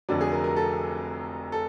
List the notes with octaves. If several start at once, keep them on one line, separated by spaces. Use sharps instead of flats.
F1 F2 D3 F#3 D5
G#4
A#4
A#4
A4
A4